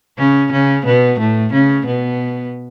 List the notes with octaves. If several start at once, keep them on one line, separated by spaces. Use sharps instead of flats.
C#3 C#4
C#3 C#4
B2 B3
A2 A3
C#3 C#4
B2 B3